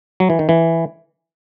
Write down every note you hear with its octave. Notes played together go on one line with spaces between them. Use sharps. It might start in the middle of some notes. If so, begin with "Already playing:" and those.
F#3
E3
D#3
E3